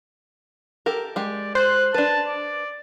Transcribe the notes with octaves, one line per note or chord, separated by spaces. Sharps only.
G4 A4 A#4
G#3 G4 D5
C5 F#6
D4 B4 A5
D5